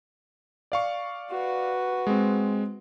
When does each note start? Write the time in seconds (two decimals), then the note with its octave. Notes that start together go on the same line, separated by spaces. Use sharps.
0.72 D5 F5 C#6
1.31 F#4 B4
2.07 G#3 C4